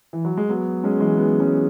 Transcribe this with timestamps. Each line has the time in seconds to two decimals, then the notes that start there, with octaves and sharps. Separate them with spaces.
0.13 E3
0.25 F#3
0.37 G#3
0.49 F#3 B3
0.84 G#3 C#4
1.00 E3 G#3
1.17 F#3 B3
1.40 G#3 C#4